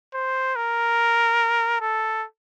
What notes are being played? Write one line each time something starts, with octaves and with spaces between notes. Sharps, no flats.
C5
A#4
A4